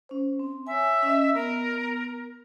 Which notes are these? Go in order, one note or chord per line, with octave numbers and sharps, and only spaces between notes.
C#4 C5
C4
C#5 E5 G#5
C#4 D#5
B3 A#4